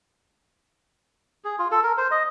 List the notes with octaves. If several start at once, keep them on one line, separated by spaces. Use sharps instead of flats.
G#4
F4
A4
A#4
C5
D#5